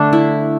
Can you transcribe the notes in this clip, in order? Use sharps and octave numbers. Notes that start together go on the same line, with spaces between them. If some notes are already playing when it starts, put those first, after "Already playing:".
Already playing: D3 A3 D4
E4